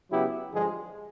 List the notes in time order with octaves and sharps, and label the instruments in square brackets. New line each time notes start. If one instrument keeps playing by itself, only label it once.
[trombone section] C#3 F#3 B3 E4 G4
G2 D3 F3 G#3